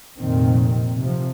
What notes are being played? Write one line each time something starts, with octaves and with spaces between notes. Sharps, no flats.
F1 A#2 D#3 C4
C3 F3